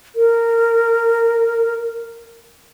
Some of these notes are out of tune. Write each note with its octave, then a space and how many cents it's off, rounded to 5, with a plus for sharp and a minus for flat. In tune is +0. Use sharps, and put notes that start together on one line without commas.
A#4 -15